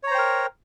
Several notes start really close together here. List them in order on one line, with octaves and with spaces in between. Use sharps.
C#5 A#5 C5 G5 A#4